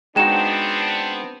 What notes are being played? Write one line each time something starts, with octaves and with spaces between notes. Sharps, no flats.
G#3 B3 C4 D4 D#4 F#4 G5 E7